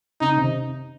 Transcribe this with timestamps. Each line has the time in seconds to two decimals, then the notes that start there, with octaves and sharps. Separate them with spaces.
0.21 C#3 D#4
0.36 C3 D#3